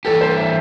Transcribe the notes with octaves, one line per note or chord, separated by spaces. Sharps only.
E3 G3 C4 G4 A4
C5
E5